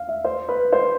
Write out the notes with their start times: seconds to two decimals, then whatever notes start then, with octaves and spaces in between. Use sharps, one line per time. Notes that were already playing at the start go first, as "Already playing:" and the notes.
Already playing: F5
0.09 E5
0.24 C5
0.49 B4
0.72 C5